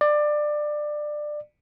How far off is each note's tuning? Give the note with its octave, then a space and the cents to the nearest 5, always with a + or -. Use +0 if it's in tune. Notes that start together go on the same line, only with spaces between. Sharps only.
D5 +20